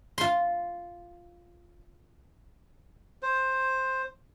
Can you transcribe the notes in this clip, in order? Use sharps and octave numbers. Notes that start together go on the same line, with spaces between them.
F4 C6
C5